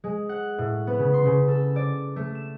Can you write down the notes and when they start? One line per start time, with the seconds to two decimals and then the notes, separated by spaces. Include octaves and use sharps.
0.04 G#3
0.29 F#5
0.58 A2
0.87 B3
0.99 C#3
1.13 C6
1.25 C#3
1.48 A4
1.76 D5
2.16 A3
2.35 E7